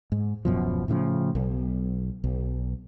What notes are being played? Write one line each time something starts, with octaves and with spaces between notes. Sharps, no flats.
G#2
D1 F#2 B2 F3
A2 C#3 E3 F3
B1
B1